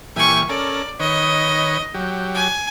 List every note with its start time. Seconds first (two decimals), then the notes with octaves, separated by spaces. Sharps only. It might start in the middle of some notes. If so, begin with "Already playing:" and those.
0.16 A#2 E3 G3 G#5 C#6
0.49 C#4 A4 A#4 D5
0.99 D#3 B4 C#5 D#5
1.94 F#3 G4
2.34 G#5